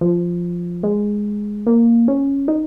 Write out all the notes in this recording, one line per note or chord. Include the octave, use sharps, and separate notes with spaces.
F3
G#3
A#3
C#4
D#4